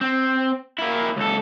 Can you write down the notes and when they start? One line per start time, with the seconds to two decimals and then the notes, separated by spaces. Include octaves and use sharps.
0.01 C4
0.79 A#3 E4
1.17 C#2 A4